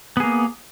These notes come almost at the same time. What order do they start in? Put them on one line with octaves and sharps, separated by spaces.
B3 G#4 A#3